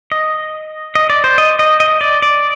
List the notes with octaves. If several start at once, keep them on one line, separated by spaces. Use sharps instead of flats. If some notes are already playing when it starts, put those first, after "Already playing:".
D#5
D#5
D5
C5
D#5
D#5
D#5
D5
D5